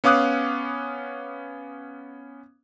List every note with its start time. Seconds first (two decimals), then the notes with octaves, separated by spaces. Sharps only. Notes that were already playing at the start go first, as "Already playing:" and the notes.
0.04 B3 C#4 F5 D6 D#6 F#6